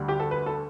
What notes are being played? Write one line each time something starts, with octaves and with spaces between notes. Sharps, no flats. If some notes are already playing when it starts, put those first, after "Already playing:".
Already playing: D2 D3 G3
G4
A4
B4
A4